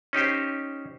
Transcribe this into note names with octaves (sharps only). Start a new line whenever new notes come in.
C#4 D#4 G4 C5